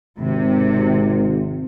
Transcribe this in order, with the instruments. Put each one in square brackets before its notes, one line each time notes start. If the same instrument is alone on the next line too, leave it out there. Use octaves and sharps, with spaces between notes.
[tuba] G#1 [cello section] C3